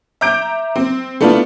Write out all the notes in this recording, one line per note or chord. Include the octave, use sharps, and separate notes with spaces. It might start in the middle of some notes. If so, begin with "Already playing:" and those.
E5 A#5 D6 G6 D7
C4
A3 B3 D4 E4 F4